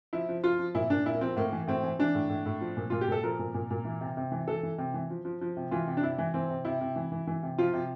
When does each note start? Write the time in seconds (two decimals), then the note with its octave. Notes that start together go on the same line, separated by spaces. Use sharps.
0.13 F3 E4
0.29 F3
0.44 F3 F4
0.59 F3
0.75 A#2 E4
0.90 A#2 D4
1.06 A#2 E4
1.14 A#3
1.21 F3 C4
1.36 A2 A#3
1.52 E3
1.67 A2 C4
1.83 E3
1.99 E3 D4
2.15 A2
2.29 A2
2.46 A2
2.61 F3
2.77 A#2
2.90 A#2 F4
3.01 G4
3.08 A#2 A4
3.23 F3 A#4
3.39 A#2
3.54 A#2
3.70 A#2
3.85 E3
4.01 C3
4.17 C3
4.32 E3
4.47 E3 A4
4.63 E3
4.78 C3
4.94 E3
5.10 F3
5.25 F3
5.41 F3
5.57 C3
5.71 E3 F4
5.87 C3
5.97 D4
6.02 C3 E4
6.18 E3
6.34 E3 C4
6.50 C3
6.65 C3 E4
6.81 C3
6.96 E3
7.12 E3
7.27 E3
7.43 C3
7.58 F3 F4
7.73 C3